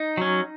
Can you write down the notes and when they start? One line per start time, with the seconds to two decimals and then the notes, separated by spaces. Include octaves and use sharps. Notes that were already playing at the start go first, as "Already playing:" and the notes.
Already playing: D#4
0.17 F#3 C#4